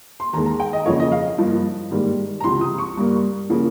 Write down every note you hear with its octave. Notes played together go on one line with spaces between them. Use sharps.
C6
D#2 D#3 G#3 A#5
A#5
G5
D#5
F2 C#3 F3 A#3 C#5
D#5
F5
G2 F3 A#3
G#2 D#3 G3 A#3
A#5
C#2 C3 F3 C6
D#6
C#6
G2 G3 A#3
C#3 F3 A#3